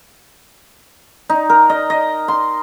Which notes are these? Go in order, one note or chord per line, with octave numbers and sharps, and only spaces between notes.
D#4
A#4
D#5
D#5
C6